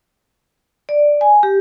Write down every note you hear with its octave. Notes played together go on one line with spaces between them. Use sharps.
D5
G#5
G4